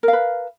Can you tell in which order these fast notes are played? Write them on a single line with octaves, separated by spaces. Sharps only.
A#4 F5 B4